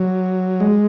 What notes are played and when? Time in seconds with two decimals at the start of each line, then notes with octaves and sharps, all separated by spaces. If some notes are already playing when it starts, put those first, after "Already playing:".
Already playing: F#3
0.60 G#3